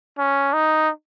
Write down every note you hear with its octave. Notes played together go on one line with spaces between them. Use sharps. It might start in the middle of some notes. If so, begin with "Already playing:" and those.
C#4
D#4